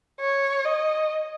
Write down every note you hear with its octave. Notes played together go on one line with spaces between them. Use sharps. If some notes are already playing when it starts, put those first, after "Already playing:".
C#5
D#5